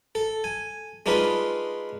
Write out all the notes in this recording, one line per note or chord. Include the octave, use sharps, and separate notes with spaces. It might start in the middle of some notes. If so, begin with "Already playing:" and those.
A4
G#5
G#3 D4 D#4 F4 B4